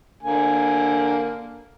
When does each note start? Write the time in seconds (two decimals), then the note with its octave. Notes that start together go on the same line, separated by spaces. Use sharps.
0.23 D3 A#3 G#5